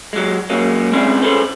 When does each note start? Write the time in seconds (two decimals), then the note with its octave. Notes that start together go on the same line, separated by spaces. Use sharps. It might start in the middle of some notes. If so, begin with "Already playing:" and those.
0.13 F#3 G#3
0.50 F#3 G#3 A#3 C#4
0.92 G#3 C4 C#4 E4 G#4 D5
1.22 C#4 G#4 A4 B4 C5